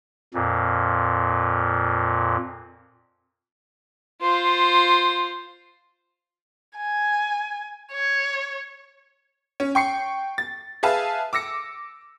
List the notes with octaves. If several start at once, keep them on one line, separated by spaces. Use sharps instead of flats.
F2 A#2
F4 C5
G#5
C#5
C#4
G5 C#6 C7 C#7
A6
G#4 B4 E5 F5 A5
D6 E6 A#6 C#7